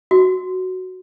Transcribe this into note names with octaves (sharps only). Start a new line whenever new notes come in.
F#4